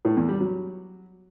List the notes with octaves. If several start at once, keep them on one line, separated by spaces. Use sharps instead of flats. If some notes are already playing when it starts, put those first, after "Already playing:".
A2
E2
G3
F#3